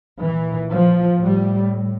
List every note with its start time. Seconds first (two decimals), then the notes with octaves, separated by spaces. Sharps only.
0.23 A#2 E3
0.72 F3
1.24 A2 G3